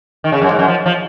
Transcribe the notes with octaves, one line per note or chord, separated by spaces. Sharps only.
D#3
C#3
F#2
G#2
F#2
F3
F3